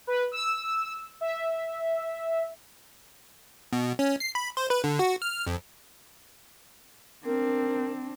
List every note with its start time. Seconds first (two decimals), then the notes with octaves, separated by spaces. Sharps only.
0.07 B4
0.32 E6
1.21 E5
3.73 B2
3.99 C#4
4.20 C7
4.35 B5
4.57 C5
4.70 B4
4.84 D3
4.99 F#4
5.22 F6
5.47 F2
7.26 C4 D4 A#4